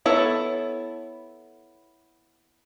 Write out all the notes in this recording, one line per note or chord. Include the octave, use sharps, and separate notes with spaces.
B3 E4 A4 C#5